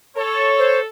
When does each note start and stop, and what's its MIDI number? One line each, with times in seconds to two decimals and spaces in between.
0.16 0.88 69
0.16 0.79 73
0.59 0.80 72